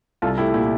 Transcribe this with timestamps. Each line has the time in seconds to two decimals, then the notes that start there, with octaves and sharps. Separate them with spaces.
0.22 C2 F4 A4
0.38 A3 E4 G4
0.54 A#2 E4 G4